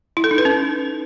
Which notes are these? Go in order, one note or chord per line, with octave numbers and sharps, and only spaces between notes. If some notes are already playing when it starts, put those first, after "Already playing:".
E4
A4
D#4
B4
C#4